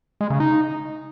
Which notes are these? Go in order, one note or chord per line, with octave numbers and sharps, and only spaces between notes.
G#3
C#3
D#4